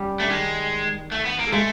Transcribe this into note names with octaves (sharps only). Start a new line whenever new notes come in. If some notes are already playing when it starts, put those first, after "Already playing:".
Already playing: G3 C#4 G4
A3 D4
D#3 G#3 D#4
A3
B3
A#3
A4
G#3 A3 G#4